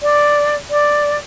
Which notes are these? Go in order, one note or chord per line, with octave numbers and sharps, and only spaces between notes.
D5
D5